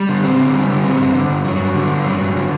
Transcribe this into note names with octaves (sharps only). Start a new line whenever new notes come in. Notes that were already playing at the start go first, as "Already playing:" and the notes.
Already playing: G3
D3
C4
D3
G3
D3
C4
G2
D3
G2
F#3
G2
D3
G2
F#3
G2
D3